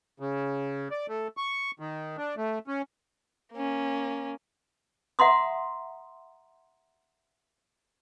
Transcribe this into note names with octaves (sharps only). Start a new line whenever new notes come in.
C#3
D5
A3
C#6
D#3
D4
A3
C#4
A#3 C#4
E5 F#5 A#5 C6 D#6